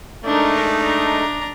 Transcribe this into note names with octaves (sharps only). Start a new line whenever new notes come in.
G#3 A3 D4 D#4 A#4
D4 A#5